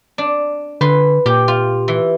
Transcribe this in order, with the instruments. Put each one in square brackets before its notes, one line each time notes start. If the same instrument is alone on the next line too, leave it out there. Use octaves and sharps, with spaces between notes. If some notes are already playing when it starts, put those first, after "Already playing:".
[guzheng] D4
[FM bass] D3 [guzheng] B4 C6
[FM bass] A#2 [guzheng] G4
[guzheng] F4
E3